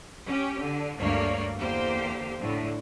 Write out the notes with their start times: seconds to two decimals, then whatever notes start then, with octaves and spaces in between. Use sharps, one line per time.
0.27 C#4 G4
0.61 D3
0.98 D2 G2 A3 A#3 C#5 D5
1.56 E2 D3 A#3 G4 C5
2.37 A2 D3